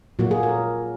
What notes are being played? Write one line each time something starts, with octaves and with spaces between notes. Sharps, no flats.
A#2 F#3 A#3 F#4
G#4
A#4